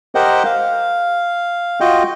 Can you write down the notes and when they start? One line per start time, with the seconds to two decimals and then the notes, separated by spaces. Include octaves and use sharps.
0.15 G4 A#4 C5 D#5 F#5 G5
0.45 F5
1.80 F4 F#4 D#5 G5